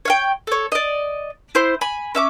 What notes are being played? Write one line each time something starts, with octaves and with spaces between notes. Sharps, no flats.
C#5 F5 G5
A4 C#5
D5 D#5
E4 C5
G#5 B5
C#4 E5 D6